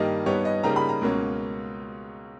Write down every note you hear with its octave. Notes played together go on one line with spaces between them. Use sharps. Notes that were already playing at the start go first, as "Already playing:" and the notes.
Already playing: G2 D#3 G3 A#3 D#5
G2 G3 B3 D#4 C#5
D#5
C#3 G3 A#3 D#4 A#5
B5
A#5
C#2 B2 A#3 C#4